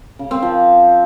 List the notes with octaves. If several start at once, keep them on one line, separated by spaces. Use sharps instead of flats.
C#3
C4
F3